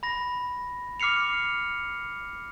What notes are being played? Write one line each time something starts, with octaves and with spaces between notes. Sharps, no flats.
B5 A#6
D6 F6 C7 C#7 F7